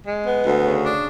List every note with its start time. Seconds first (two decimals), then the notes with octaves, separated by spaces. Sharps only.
0.07 G#3
0.26 B3
0.45 D2
0.64 C#3
0.84 D4